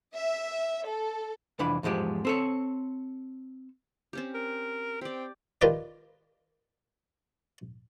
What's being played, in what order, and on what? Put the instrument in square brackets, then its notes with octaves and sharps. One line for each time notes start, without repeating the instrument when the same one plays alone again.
[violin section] E5
A4
[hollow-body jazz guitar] C2 F2 E3 D4 B5
E2 G#2 F3 G#3 G4
C4 A4 C#5
[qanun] C4 C#4 G4
[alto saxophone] A#4
[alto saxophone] C4 [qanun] G4 D5
[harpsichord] D#3 F4 G4 A#4 B4 D5